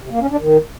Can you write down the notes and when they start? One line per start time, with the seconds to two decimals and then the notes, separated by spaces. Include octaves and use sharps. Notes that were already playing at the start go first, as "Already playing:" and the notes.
0.02 C3
0.11 A#3
0.21 C#4
0.30 D4
0.40 D#3